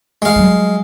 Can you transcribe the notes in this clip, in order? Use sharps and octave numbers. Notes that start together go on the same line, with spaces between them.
G#3 F5
F#3 G3